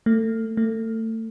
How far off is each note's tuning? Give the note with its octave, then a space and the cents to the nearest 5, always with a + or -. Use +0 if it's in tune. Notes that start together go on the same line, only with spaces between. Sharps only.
A3 +30
A3 +30